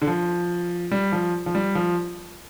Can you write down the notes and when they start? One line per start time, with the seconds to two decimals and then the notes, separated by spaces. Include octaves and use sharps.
0.02 D3
0.07 F3
0.91 G3
1.12 F3
1.46 F3
1.55 G3
1.75 F3